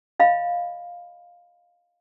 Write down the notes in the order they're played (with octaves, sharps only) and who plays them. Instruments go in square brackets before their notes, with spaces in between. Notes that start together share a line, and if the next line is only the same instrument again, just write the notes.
[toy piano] D#5 F5 B5